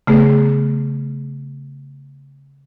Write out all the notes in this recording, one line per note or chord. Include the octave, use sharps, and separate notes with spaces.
C#3 A3 B3 G#4